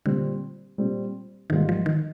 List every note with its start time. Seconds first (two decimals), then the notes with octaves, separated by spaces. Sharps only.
0.06 A#2 D3 G3 C4
0.78 A#2 G3 C4
1.50 G#1 G#2 D#3 G3 A#3 F4
1.69 F3
1.86 D#3